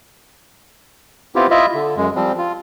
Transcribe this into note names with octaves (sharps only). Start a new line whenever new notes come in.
B3 C4 E4 F4 G4
E4 F4 D#5 E5
D3
F#2 G#3
F3 G3 C4
F4